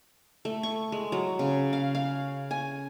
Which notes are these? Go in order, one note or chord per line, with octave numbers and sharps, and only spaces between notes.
A3
C#6
G#3
F#3
C#3
F5
F5
G#5